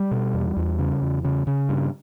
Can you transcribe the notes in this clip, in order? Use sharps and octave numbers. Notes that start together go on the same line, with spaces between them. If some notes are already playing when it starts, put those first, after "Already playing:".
Already playing: G3
B2
E2
E2
C#3
E2
C#3
C#3
G2